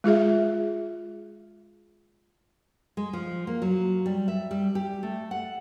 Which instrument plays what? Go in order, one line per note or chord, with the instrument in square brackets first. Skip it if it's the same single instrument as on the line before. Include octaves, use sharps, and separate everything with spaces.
[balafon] G#3 F4 G#4 E5
[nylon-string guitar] G#3
F3
A#3
F#3
G3
E5
G3
G4
A3
F#5